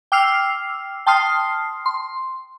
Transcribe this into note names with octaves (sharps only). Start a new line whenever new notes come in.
G5 D6 E6 F6 C7 F7
G5 A5 C6 D#6 F6 C7
C6